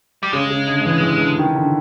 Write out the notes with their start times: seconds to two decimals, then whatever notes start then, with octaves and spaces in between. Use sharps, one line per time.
0.23 G3
0.33 C#3 G#3
0.50 C#3
0.67 D3
0.85 E3
1.03 E3
1.21 D3
1.38 D#3
1.56 D3